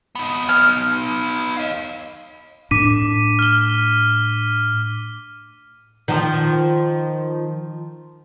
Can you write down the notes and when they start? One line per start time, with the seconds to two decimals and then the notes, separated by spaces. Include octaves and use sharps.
0.15 B3 D#4
0.49 F6
1.57 D#5 F5
2.71 A2 D4 D6 B6 D#7
3.39 F6 G7
6.08 D#3 F3